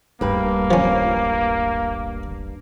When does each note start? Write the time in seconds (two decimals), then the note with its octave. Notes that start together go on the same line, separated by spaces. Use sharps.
0.21 D1 G1 G2 A#3 B4
0.71 F3 C#4